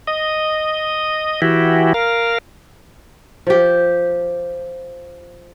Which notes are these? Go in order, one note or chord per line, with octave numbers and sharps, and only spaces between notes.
D#5
E3 E4 F#4 G4
A#4 F5
F3 G4